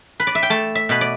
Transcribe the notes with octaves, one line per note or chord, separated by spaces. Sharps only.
B4
D5
E5
G5
A3 A5
E5
B2 B4
D5